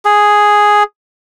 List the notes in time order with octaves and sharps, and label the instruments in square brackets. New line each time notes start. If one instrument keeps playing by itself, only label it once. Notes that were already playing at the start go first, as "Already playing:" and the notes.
[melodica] G#4